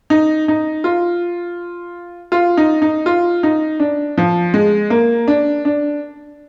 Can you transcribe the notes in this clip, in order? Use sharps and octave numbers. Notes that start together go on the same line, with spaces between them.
D#4
D#4
F4
F4
D#4
D#4
F4
D#4
D4
F3
G#3
A#3
D4
D4